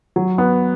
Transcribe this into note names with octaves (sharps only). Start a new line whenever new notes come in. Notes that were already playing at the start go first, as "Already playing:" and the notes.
F#3
B3